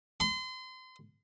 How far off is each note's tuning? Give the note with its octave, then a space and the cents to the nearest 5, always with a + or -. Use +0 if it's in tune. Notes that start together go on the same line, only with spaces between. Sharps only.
C6 -30